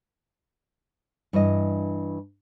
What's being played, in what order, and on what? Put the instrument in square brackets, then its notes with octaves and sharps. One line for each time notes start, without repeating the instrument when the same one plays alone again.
[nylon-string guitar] G2 E3 E4 D#5